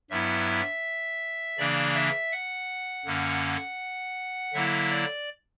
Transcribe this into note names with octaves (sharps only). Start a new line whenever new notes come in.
G2 F#3 B3 E4 E5
C#3 E3 A#3 D4 D5
E5
F#5
F#2 D3 A#3 C#4
D3 F#3 A#3 E4 E5
D5